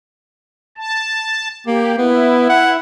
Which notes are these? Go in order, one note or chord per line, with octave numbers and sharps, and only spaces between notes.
A5
A#3 G4
B3 E4
F#5